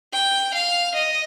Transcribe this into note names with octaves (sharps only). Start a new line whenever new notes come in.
G5
F5
D#5